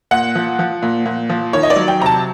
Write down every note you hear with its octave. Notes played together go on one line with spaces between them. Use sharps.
A#2 F#5
F3
F3
A#2
A#2
F3
D#3 C#5
D#5
D5
F#3
G5
C3 A#5
A5